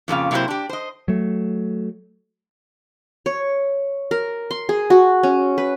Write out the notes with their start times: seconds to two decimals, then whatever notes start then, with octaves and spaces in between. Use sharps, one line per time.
0.08 F2 A#2 C#3 F5
0.31 C3 F#3 A#3 D#4 E4 C5
0.48 D4 G4
0.69 C5 D#5
1.08 F#3 A3
3.26 C#5
4.11 A#4
4.51 C6
4.69 G#4
4.90 F#4
5.23 C#4
5.58 B4